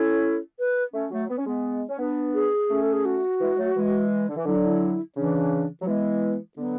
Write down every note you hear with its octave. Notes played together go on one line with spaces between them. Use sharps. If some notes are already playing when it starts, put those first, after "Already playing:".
Already playing: C#4 E4 A4
B4
A3 C#4
F#3 A3
B3
C#4
G#3 B3
C#4
B3 D4
G#4
A3 C#4
A4
G#4
F#4
E3 G#3
F#3 A3
E3 G#3
D3
E3
D3 F#3 E4
D4
E4
C#3 E3 D4
F#3
E3 G#3 B3
D3 F#3 B3